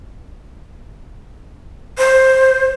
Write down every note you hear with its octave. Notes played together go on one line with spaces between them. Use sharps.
C5